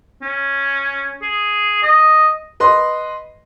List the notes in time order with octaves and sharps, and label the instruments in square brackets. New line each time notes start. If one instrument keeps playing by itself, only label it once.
[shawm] C#4
G#4
D#5
[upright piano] B4 D#5 C6